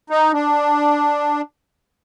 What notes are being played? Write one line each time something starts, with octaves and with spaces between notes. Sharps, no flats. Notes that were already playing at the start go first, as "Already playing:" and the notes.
D#4
D4